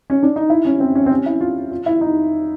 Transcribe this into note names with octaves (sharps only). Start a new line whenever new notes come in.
C#4
D4
D#4
E4
C#4
C4
C#4
C4
C#4
E4
F4
F4
E4
D#4